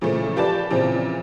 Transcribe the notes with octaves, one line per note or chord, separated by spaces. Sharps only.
A#2 C#3 E3 F3 A3
F4 G4 B4 D5 A5 A6
A#2 C#3 E3 F3 C4